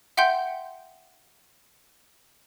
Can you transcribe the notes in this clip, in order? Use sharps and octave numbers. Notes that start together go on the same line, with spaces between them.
E5 F#5 G5 C6 G6